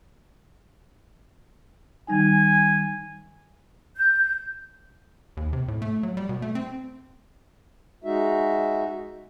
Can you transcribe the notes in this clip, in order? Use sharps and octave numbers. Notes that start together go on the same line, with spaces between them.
D#3 G3 D#4 G#5
G6
D#2
C3
A2
A3
F#3
G3
B2
A3
C4
G#3 D#4 F#4 E5